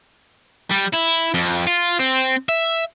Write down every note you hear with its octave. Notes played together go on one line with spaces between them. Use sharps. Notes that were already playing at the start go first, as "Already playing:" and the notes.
G3
E4
F2
F4
C4
E5